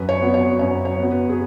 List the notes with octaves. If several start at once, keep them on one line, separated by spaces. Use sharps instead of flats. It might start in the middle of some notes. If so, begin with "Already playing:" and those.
Already playing: F#2 B4
C#5
F#3 B3
C#5
F#2 C#5
C#5
F#3 B3
B4
G#4